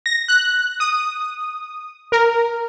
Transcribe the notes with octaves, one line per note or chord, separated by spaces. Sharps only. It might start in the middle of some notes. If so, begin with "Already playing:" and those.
A#6
F#6
D#6
A#4